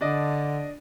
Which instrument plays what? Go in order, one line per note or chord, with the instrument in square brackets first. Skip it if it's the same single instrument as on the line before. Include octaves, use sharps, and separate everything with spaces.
[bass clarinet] D3 [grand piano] D4 D5 D#5